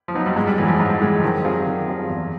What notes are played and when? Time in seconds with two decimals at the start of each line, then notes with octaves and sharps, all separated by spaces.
0.08 F3
0.15 F#3 B3 D#4
0.26 G3
0.36 G#2 G#3
0.47 G3
0.58 E3 F#3 G#3
0.68 F3
0.79 G#2 F#3
1.01 G3 G#3
1.06 E3
1.17 F#3
1.23 D#3 F3
1.44 F#3 G3 C4 F4 G#4
1.66 D#3
1.87 G3 C4 F4 G#4
2.09 E2